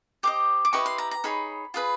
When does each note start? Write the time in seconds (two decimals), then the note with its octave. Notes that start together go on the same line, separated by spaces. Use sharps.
0.23 G4 C5 D#5 D6
0.65 D6
0.73 E4 G4 B4 D#5 C#6
0.86 C6
0.98 A#5
1.11 A#5
1.24 D#4 G#4 C#5 B5
1.74 F4 G#4 B4